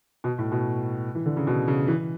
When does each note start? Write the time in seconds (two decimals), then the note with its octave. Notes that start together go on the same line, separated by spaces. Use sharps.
0.24 B2
0.38 A2
0.52 B2
1.15 E3
1.26 D3
1.37 C#3
1.47 B2
1.68 C#3
1.88 E3